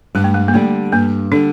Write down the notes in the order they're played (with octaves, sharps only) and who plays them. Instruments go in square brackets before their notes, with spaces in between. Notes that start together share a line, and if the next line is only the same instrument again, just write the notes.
[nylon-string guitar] G2 [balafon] G#3
[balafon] A3
G#3
A#3
[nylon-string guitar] D3 G3 [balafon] A3
[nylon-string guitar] G2 [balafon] A#3
[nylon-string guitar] D3 G3 [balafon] D4